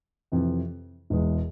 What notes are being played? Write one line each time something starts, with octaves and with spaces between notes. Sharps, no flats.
F2 C3 E3
E1 E2 E3 G#3